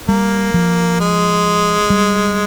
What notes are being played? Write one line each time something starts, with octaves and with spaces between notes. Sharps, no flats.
G3 A#3
F3
G#3
G3